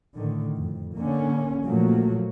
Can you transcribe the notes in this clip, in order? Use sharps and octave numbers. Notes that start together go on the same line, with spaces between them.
A2 D3 D#3
F2
D3 A#3 C#4
A#2 F3 F#3 A3 A#3